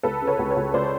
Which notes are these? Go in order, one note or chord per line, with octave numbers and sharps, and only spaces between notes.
C#2 A4 B4
C#3
B4 C#5
C#2
B4 C#5
C#2
C#2 C5 D5